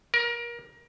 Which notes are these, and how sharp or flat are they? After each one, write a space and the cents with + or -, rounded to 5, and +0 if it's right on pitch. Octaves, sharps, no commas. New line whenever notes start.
A#4 +25